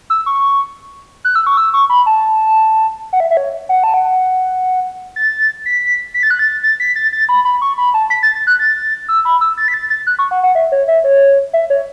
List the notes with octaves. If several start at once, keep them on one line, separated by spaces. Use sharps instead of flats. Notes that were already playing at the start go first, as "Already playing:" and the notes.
E6
C#6
F#6
E6
C#6
E6
C#6
B5
A5
F#5
E5
E5
C#5
F#5
A5
F#5
A6
B6
B6
A6
F#6
A6
A6
B6
A6
A6
B5
B5
C#6
B5
A5
B6
A6
A6
F#6
A6
E6
B5
E6
A6
B6
A6
A6
F#6
C#6
F#5
F#5
E5
C#5
E5
C#5
E5
C#5